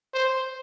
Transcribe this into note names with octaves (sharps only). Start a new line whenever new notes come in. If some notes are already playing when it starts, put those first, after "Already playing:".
C5